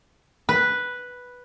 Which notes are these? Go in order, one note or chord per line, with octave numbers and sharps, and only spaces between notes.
B4